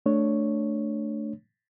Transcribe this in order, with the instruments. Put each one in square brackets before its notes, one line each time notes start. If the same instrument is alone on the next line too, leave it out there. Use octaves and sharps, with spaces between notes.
[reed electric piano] A3 D4 C#5